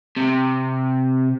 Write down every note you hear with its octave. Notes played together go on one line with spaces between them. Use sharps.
C3